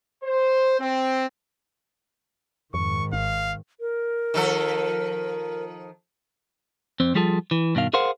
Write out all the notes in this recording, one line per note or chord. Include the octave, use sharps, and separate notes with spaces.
C5
C4
F2 G#2 D#3 C#6
G#1 F5
A#4
D#3 F3 A4
F2 C4
F3 G3 F4 G#4 A4
E3
G2 B2 D#3 F5
G#4 A#4 C5 F5 F#5